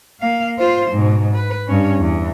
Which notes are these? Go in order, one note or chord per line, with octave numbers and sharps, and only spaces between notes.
A#3 F5
F4 C5
G#2 B2
B4
G2 C#4
E2